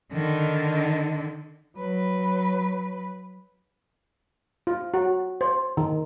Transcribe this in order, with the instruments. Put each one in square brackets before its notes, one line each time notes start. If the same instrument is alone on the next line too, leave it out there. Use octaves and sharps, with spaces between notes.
[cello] D3 D#3
F#3 B4
[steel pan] F4
F#4
C5
D#3